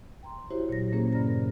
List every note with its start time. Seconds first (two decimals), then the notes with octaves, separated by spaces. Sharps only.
0.23 G5 A#5 C6
0.51 E4 F#4 G4 C5 C#5 E5
0.69 A#2 F#3 A#6
0.92 A#2 A#3 C#4 G#4 C5 A#5
1.13 G2 A#2 C#3 D5 A#5 A#6
1.27 A#4